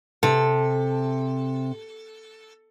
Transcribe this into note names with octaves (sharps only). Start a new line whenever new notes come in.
C3 A4